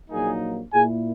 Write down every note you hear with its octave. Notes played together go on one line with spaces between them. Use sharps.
A#1 A#2 F#3 A#3 D#4 G#4 G#5
A#2 A#3 E4 G#4 G#5